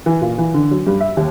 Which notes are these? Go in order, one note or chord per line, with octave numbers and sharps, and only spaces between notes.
E3
A#2
E3
D3
F#3
G2
E5
D#2